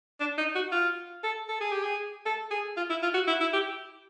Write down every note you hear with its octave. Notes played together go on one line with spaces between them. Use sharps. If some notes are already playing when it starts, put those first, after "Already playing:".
D4
D#4
F#4
F4
A4
A4
G#4
G4
G#4
A4
G#4
F4
E4
F4
F#4
E4
E4
G4